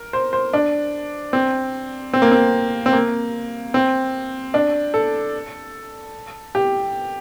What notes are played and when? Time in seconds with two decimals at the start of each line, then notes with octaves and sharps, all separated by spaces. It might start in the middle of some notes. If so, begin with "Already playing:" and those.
Already playing: A#4
0.13 C5
0.33 C5
0.53 D4
1.33 C4
2.13 C4
2.22 A#3
2.32 C4
2.86 C4
2.93 A#3
3.74 C4
4.54 D4
4.94 A4
6.55 G4